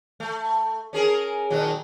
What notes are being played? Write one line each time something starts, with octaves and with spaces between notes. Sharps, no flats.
A3
C#4 G#4 A#4
A#2 D#3 F#3